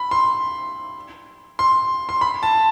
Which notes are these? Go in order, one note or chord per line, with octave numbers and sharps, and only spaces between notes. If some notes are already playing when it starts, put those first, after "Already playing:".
Already playing: B5
C6
C6
C6
B5
A5